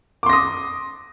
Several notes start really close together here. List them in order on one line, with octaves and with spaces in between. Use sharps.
D6 C6 A#6 D#6